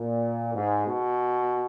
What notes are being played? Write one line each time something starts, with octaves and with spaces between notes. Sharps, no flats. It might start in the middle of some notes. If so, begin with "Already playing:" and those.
Already playing: A#2
G#2
B2